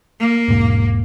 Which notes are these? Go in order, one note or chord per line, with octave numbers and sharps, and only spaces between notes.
A#3
E1 G#2